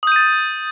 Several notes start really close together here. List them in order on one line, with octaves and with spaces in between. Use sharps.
D#6 G6 D#7 A6